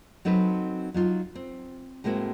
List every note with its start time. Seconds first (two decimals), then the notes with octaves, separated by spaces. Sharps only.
0.25 F#3 C4 D#4 A4 B4
0.94 F#3 D#4 F4
1.35 C4
2.04 A2 G#3 A#3 C4 F#4